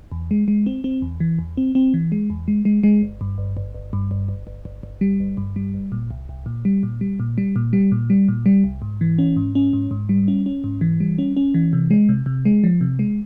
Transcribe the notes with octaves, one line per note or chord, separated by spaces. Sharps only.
E2
G#3
G#3
C4
C4
E2
E3
E2
C4
C4
E3
G#3
E2
G#3
G#3
G#3
G1
G2
G1
G1
G1
G2
G1
G1
G1
G1
G1
G3
G1
G2
G3
G1
A#2
C2
C2
A#2
G3
A#2
G3
A#2
G3
A#2
G3
A#2
G3
A#2
G3
C2
G#2
E3
C#4
G#2
C#4
G#2
G#2
G3
C#4
C#4
G#2
E3
G3
C#4
C#4
E3
C3
G#3
C3
C3
G#3
F3
C3
G#3